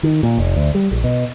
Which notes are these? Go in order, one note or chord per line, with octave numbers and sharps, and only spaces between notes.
D#3
A#2
F1
D2
G3
A#1
B2